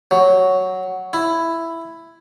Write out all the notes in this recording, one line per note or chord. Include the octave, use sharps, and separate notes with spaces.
F#3
E4